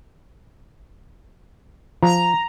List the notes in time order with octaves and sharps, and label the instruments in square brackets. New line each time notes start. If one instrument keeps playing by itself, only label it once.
[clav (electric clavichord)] F3 [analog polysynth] A#5